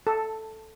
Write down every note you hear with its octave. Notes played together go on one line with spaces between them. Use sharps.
A4